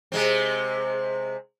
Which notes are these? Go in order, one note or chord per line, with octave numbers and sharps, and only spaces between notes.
C3 G#3 C4